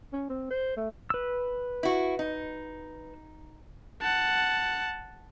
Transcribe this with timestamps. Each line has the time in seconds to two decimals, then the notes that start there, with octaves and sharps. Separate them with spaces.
0.13 C#4
0.29 C4
0.50 C5
0.77 A3
1.10 B4 E6
1.83 E4 F#4
2.19 D#4
4.01 F#5 A5